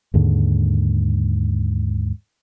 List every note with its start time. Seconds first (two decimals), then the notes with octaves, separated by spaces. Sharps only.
0.14 D#2 G#2 D3